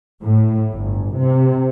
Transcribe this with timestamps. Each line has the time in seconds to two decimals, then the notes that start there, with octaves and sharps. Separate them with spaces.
0.21 A2
0.72 G1
1.17 C3